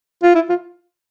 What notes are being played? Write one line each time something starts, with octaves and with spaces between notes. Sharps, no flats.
F4
E4
F4